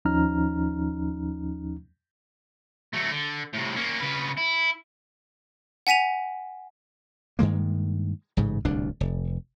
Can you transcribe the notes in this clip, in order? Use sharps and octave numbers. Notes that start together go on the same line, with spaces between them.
D#2 F3 C#4 D#4 A#5 F6
F#3 A3
D3
A2 C3
A#3 C#4
C#3 B4
E4
F#5 G#5 B6 D#7 F7
G2 D#3 G#3 A#3
A1 G#2 C#3
D1 C2 A#2 D4
F1